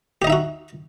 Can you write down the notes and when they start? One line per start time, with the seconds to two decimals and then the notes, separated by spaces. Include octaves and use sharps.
0.22 G4
0.24 D#5
0.27 D#4
0.30 E5
0.32 F#4